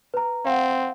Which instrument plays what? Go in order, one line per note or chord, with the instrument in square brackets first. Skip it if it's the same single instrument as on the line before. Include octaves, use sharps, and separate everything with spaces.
[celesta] B4 A#5
[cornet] C4 [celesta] F5 F#5